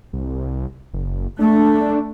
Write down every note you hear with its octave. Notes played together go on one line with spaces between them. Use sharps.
C2
F#1
A3 D4